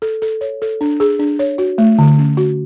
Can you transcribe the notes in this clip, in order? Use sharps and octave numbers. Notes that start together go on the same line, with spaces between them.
A4
A4
C#5
A4
D4
G#4
D4
C#5
F#4
A3
D3
C#4
F#4